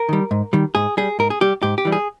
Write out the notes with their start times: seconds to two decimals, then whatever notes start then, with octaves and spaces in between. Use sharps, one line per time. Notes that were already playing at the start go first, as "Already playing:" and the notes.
Already playing: A#4
0.09 D#3 G3
0.31 G#2
0.53 D#3 G3
0.75 G#2 G#4
0.97 G3 G#4
1.19 G#2 A#4
1.30 G#4
1.41 G3 G4
1.63 G#2 G4
1.78 G4
1.85 E3 G3
1.92 G#4